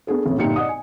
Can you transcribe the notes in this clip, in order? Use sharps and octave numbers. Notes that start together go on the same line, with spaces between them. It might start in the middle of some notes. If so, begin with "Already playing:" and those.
B3 D4 G#4 A4
A1 F2 A2
G1 A#2 D#4 G4 G5 C#7
D5 D#5 F#5 D#6
G#5